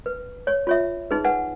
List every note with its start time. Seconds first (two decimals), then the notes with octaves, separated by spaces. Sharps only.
0.06 B4
0.47 C#5
0.67 F4 C#5 E5
1.11 D#4 G#4 B4
1.24 B4 F#5 G#5